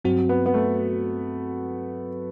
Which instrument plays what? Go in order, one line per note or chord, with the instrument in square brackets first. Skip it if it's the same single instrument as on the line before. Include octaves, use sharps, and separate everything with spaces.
[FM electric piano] G2 F#3 C4 F#4
[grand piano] B3
B3
A3